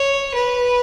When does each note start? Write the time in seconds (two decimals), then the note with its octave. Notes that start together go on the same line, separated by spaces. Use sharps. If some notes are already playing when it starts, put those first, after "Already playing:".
Already playing: C#5
0.34 B4